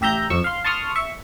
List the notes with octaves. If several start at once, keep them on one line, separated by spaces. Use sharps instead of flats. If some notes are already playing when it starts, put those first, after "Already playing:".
A1 G4 E5 A#5 G6
F2 C#6 E6
F5 C6
A5 C6 C#6 D#6 F6
E5 C#6